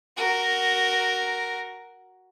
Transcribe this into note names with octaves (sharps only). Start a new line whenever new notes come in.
F#4 A#4